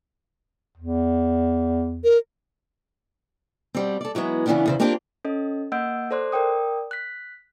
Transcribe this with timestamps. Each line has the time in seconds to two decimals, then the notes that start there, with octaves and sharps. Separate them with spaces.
0.78 E2
2.04 A#4
3.74 B2 G3 C4
4.01 A4 D5
4.15 E3 F#3 G#3 B3
4.46 C#3 E3 G#3 B3 C#4 D4
4.66 E2 C#3 C5
4.80 A#3 C4 D4 F4 G4 A#4
5.25 C#4 A4 D#5
5.72 A#3 D#5 F#5 E6 G6 D7
6.11 A4 C5 D5 C6 F#6
6.32 A#4 D5 G5 D#6
6.91 F#6 B6